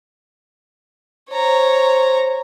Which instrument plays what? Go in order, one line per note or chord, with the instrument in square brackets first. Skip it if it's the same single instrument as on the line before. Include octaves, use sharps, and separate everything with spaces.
[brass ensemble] C5 [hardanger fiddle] C#5 A#5